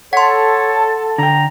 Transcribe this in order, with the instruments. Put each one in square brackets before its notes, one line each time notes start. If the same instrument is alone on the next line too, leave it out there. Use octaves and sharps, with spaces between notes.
[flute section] A4 [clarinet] C#5 [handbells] F#5 C6
[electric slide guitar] D3 G5 [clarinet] A#5